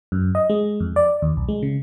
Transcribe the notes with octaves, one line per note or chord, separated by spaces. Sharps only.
F#2
D#5
G#3
F2
D5
D#2
B1
G#3
C#3